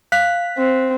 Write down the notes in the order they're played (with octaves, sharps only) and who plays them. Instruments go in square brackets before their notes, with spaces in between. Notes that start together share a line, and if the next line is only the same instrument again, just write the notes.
[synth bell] F5 F#6 B6
[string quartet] C4